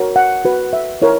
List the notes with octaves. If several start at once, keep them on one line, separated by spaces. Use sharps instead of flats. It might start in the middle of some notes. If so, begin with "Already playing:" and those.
Already playing: F#4 A#4 C#5
F#5
F#4 B4
E5
E4 A#4 C#5